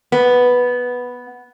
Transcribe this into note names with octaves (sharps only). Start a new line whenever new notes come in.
B3